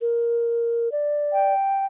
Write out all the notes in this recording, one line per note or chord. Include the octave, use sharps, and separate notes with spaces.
A#4
D5
G5